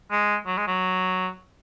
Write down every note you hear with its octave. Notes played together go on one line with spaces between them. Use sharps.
G#3
F#3
G#3
F#3